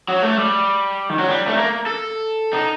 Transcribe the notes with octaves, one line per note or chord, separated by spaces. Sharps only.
F#3
A3
G3
D#3
F#3
G3
A3
A#3
A4
D#4